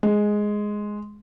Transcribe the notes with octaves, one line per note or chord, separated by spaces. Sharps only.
G#3